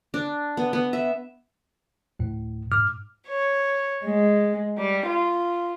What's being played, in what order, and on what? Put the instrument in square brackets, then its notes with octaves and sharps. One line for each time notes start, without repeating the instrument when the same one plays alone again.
[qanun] D4
B3
B3
E5
[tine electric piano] D2 A2
G#2 D6 F6
[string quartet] C#5
G#3
G3
F4